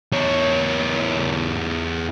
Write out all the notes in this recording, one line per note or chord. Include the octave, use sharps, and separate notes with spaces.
E2 C#5